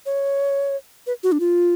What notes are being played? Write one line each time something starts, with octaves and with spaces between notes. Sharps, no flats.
C#5
B4
F#4
D4
F4